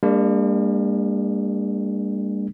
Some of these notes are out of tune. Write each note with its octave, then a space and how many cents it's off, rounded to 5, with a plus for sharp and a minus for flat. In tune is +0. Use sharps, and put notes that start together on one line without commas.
G3 +45 A#3 -15 D4 +0